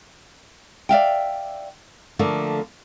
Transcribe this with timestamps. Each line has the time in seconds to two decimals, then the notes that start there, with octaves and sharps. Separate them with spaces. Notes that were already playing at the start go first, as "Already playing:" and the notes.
0.89 D5 E5 F5 G5
2.19 D3 F3 A3 A#3